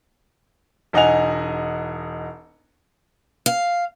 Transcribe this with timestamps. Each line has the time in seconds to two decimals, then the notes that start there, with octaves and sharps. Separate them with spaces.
0.93 E1 D#4 D#5 F#5 G#5 F7
3.46 F5